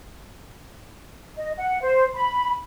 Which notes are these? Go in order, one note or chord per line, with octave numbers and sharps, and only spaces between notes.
D#5
F#5
C5
B5